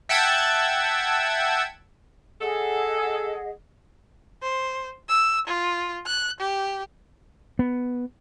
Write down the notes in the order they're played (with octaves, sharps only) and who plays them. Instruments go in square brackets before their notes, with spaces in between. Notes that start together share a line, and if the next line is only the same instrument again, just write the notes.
[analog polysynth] E5 F#5 G5 A5 E6 G#6
[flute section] G#4 D#5 F#5 [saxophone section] A4
[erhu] C5
E6
F4
F#6
G4
[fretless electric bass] B3